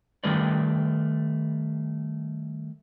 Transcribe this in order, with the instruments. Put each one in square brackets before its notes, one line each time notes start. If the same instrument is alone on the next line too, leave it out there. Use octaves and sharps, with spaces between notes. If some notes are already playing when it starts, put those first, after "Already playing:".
[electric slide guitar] D#3 G3 A3 A#4 B4 D5